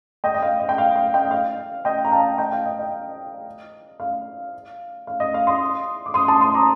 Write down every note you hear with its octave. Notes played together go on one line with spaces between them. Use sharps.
D#5 G5
D#5
F5
D#5
G5
F5
F5
D#5 G5
D#5
F5
D#5 G5
A#5
F5 A5
D#5 G5
F5
D#5
D#5
F5
F5
D#5
F5
C6 D#6
D6
C6 D#6
A5 C6
C6 D#6
A#5 D6